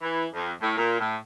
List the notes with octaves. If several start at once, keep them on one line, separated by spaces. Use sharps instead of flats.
E3
F2
A2
A#2
A2